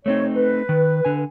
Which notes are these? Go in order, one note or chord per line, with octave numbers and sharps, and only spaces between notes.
A3 C4 D#4 C#5
B4
D#3
D3 G#5